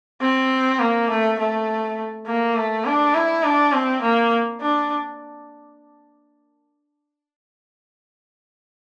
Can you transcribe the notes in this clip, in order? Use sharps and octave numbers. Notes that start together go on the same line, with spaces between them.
C4
A#3
A3
A3
A#3
A3
D4
E4
D4
C4
A#3
D4